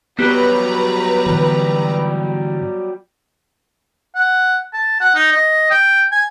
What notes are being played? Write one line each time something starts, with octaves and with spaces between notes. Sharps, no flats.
F#3 G3 B3 G4 B4 A#5
G#2 D3 E3
F#5
A5
F#5
D#4
D#5
G5
G#5